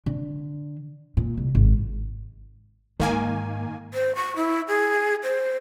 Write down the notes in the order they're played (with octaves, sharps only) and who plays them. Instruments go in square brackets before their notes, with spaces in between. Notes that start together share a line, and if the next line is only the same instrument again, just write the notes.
[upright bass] D3
A#2
C2
G#1
[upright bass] G#2 [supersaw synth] D#3 A#3 G#5
[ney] C5
C#6
E4
G#4
C5